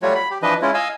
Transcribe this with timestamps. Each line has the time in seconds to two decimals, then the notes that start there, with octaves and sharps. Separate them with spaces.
0.02 F#3 G3 A3 F4 F#4 C#5
0.15 B5
0.31 G4
0.42 E3 F3 D4 B4 D#5
0.62 G#3 C#4 E4 F4
0.74 D#5 F5 G#5 E6